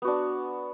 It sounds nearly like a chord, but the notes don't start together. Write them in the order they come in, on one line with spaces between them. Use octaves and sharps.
B3 F#4 D4